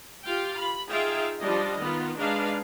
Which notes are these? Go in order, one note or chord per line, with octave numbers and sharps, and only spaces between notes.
F4 G4 F5 G5
B5
D#4 F4 G#4 E5 F5 G5
F3 G3 D4 D#5
D#3 B3 F4
G#3 D4 D#4 B4 F5